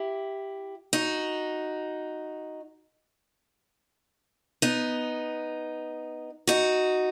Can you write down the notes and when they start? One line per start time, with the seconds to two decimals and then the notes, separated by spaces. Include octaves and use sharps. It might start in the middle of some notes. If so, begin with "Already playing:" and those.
Already playing: E4 G4
0.93 D#4 F#4
4.62 B3 D#4
6.47 D#4 F#4